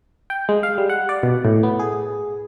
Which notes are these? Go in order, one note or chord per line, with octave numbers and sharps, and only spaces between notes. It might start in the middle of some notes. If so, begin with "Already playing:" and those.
G5
G#3
F5
G3
F#5
D5
B2
A2
B3
G#4